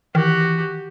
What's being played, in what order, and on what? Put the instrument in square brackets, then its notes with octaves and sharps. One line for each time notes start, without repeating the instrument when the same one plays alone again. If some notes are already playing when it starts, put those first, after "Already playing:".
[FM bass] D#3 [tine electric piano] E3 [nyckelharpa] F#4 G4